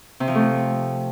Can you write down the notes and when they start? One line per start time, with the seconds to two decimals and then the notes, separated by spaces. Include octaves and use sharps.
0.20 C3
0.28 F3
0.35 A3